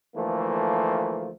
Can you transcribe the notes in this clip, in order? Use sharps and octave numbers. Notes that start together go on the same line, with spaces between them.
D2 E3 F3 A3 A#3